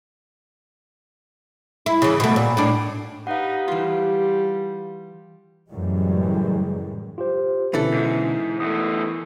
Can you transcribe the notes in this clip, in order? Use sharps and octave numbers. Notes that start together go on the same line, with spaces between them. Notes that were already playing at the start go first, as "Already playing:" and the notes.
E4
C#3 E3
B2 A3
A#2
A2 D4
D#4 G4 B4 F5 F#5
E3 G3 F4
F#2 A2 C#3 E3 G3 G#3
F4 G4 C5
B2 D3 E3 C#4 A4
G#2
E2 A3 D#6